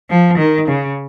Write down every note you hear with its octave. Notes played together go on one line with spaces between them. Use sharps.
F3
D#3
C#3